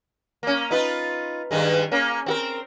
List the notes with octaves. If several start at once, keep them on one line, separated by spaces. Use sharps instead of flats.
A#3 C#4
D#4 F4 B4
G2 D#3 G#3
A#3 C#4
C4 F#4 A#4